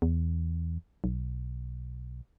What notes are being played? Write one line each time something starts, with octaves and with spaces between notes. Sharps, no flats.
E2
B1